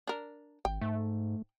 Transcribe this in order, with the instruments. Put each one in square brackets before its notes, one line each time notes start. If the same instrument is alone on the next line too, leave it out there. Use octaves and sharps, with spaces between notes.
[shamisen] D4 A#4
[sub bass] G#1 [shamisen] G5
[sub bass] G#2 [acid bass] A3